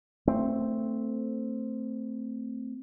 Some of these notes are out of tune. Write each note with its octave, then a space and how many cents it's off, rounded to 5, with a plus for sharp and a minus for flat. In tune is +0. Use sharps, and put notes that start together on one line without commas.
A3 +20 C4 +0